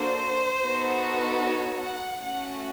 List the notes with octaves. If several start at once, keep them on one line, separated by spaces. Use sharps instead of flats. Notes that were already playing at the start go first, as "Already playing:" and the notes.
Already playing: A#3 D4 F#4 A4 C5
B3 D#4 F#4 A4
C#5
F#5
A3 C#4 F#4 F#5